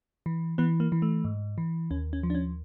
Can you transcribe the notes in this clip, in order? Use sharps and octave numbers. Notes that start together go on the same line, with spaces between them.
E3
E3 B3
A#3
E3
A3
G#2
E3
D#2 C#4
C#4
F3
D4
C#4